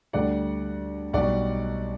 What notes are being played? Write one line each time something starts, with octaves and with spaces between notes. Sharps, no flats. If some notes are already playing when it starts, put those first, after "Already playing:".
D2 D3 G3 D5 F#5
B1 B2 G3 D5 F#5